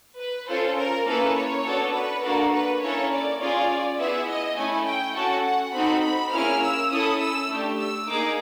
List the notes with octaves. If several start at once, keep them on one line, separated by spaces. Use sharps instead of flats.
B4
C#4 F4 A4 C5
A#4
A#3 C#4 E4 A4 B4
C#5
B3 D4 F#4 A4
B4
A#3 D4 F#4 A4 A#4
B4
A#3 C#4 E4 A4 C#5
D5
C#4 F4 G#4 D5
B3 E4 G#4 E5
D#5
A3 C#4 E4 G#5
G5
C#4 F#4 A4 F#5
F#5
C4 D#4 F#4 A4 B5
B5
A#3 C#4 E4 G#4 F6
E6
C#4 E4 A4 D#6
E6
A3 D4 G4
E6
A#3 D#4 G#4 D6